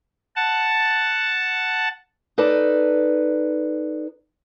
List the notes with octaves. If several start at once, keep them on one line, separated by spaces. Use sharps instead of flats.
F#5 A5
D#4 A4 B4 D5